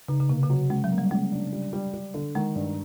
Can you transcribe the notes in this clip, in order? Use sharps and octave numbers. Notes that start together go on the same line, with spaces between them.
C#3 D#4
C#3
C3 A#3
C#3
F#3
C#3 G#3
F#3
A#3
G3
C#3 G#3
D4
G3
G3
G3
D3
D#3 G#3
G2